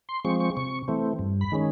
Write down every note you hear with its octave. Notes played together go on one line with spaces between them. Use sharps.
C6
F3 G#3 C4 C#6
C#6
C3 C#6
E3 A3 C4
G2
B5
D#3 G#3 C#4